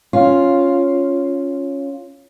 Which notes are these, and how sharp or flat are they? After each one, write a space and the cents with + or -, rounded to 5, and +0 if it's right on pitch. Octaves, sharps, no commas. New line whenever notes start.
C#4 +0 F4 +0